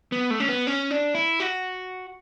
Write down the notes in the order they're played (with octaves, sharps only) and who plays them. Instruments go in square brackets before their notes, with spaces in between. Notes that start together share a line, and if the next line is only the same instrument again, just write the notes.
[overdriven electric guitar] B3
A3
C#4
B3
C#4
D4
E4
F#4